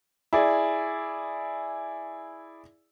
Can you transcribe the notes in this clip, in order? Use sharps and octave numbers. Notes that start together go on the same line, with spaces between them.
E4 G#4 D5